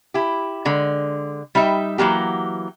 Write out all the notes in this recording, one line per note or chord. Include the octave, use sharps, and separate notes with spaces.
E4 G4
D3 G#3
G3 D#4 G4 E5
E3 F#3 A#3 G4